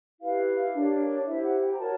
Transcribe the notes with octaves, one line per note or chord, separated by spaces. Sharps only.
E4 G4 B4 F5
D4 G4 A#4 C#5
E4 G4 C5 E5
F#5
G5
A#5
F#4 A#4 C#5 A5